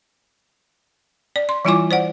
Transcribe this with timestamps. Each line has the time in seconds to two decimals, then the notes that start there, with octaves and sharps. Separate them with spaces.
1.36 D5
1.49 C6
1.65 E3 G3 E4 F4 G#5 D6
1.91 C5 D5 F#5